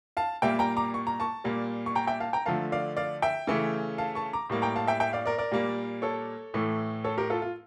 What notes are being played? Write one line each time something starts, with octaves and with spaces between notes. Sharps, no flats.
F5 A5
A#2 G3 A#3 E5 G5
G5 A#5
A#5 D6
C#6
A#5
A5 C#6
A#2 G3 A#3
C#6
G5 A#5
E5 G5
F5 A5
G5 A#5
D3 F3 A3 F5 A5
D5 F5
D5 F5
E5 G5
C#3 E3 A3
F5 A5
A5 C#6
A#5 D6
A2 G3 A#3
G5 A#5
F5 A5
E5 G5
E5 G5
D5 F5
A#4 D5
A#4 D5
A#2 G3 A#3
A4 C#5
A2 E3 A3
A4 C#5
G4 A#4
F4 A4
F4